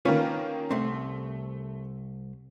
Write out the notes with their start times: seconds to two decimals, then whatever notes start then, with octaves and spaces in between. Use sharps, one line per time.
0.05 D#3 A#3 C#4 F4 B4 C#5
0.71 C2 A3 C4